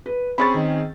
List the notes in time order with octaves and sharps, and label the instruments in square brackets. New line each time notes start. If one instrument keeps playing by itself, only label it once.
[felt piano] B4
[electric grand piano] C4 C#4 G#4 [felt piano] B5 C#6 A6
[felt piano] D#3